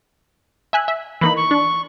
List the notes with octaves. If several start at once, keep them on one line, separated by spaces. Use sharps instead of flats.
E5 G#5 F#6
E5
E3 A#3 D#4 B5
C#6
D4